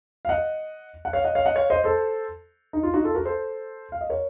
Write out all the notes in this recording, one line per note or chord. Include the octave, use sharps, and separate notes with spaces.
F5
D#5 F#5
F#5
C#5 F5
D#5 F#5
C#5 F5
D#5 F#5
C#5 F5
C5 D#5
A4 C5
D#4
F4
D#4 F#4
F4 A4
F#4 A#4
A4 C5
F5
D#5
A#4 C#5